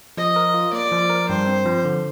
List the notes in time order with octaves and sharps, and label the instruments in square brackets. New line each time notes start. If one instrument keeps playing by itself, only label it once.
[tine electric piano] F3 [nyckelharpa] D#5
[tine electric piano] A#4
F4
[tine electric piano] A#3 [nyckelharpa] D5
[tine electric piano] F3
A#4
[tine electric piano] G2 [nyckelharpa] C5
[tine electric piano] C4
F3
D3